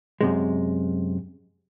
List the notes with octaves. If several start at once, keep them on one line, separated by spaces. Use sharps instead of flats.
F#2 C3 G#3